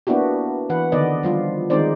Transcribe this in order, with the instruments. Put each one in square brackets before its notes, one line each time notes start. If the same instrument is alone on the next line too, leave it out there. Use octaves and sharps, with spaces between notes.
[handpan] A#3 B3 D4 E4 F#4 G4
E3 B4 F#5
D3 D#3 B3 D5 D#5
F3 G3 F4
D#3 G#3 C4 D#4 C5 D5